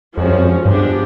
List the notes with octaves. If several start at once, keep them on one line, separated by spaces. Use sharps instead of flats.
F2 F3 G#3 C#4 F#4
F#2
F2
G2 F3 G#3 B3 D4 G4